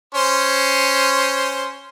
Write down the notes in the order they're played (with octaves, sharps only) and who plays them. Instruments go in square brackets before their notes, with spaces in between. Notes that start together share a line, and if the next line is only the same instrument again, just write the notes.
[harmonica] C#4 C5